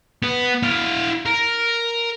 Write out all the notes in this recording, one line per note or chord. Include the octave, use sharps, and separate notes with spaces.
B3
E4 F5
A#4